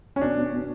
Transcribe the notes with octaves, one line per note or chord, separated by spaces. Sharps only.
C#4
B2 D4
B2
B2